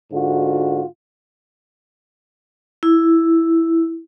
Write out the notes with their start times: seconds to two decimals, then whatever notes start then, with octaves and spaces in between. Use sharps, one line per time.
0.12 G#2 D3 F4 F#4
2.83 E4